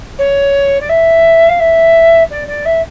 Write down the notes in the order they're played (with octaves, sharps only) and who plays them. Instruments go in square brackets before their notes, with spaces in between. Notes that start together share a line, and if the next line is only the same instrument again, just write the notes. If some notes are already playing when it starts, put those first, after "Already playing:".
[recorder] C#5
D5
E5
F5
E5
D5
D5
E5